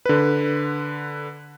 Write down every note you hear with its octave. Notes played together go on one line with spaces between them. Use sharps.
D3 B4